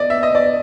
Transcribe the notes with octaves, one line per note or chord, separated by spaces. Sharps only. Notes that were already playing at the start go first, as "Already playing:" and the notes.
Already playing: D5 D#5
E5
D#5
D5